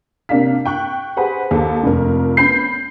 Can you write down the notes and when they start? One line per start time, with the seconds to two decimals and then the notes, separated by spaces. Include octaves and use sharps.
0.29 C3 A#3 D4 G4 F5 B6
0.65 G5 C#6 F#6
1.17 G4 G#4 B4 C5 F#5
1.51 D#2 A4
1.83 F1 F2 A#4
2.37 B3 C#4 B5 G6 C7